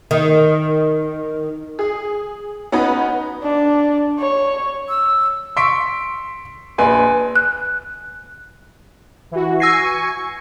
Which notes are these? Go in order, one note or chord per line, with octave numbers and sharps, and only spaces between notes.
D#3
G#4
B3 C#4 D#4 F#4 B4
D4
C#5
E6
C6 C#6 E6 B6 D7
A#1 B4 G#5 C6
F#6
E3 F#4
G#5 C#6 E6 A#6 C7